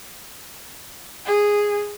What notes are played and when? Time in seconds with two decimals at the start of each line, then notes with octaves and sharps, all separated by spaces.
1.26 G#4